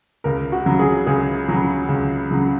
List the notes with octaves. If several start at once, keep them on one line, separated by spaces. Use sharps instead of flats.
C#2 A#4
F#4
C#3 F#3
G#4
C#2 G#4
C#3 F#3
C#2
C#3 F#3